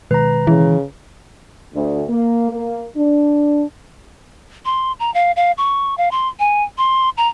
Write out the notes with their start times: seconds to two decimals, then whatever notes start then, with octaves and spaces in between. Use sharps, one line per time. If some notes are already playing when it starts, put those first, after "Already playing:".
0.11 B2 D#3 G#3 B4 A#5
0.47 C#3 E3
1.73 D2
2.09 A#3
2.50 A#3
2.96 D4
4.65 C6
5.00 A#5
5.14 F5
5.36 F5
5.58 C#6
5.98 F5
6.11 C6
6.39 G#5
6.78 C6
7.17 A#5